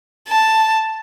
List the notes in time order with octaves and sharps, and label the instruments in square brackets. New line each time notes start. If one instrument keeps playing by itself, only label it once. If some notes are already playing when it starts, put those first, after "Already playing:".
[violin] A5